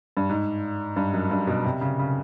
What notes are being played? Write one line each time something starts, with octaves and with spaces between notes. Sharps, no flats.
G2
G#2
G2
F#2
G2
B2
C3
C#3
C#3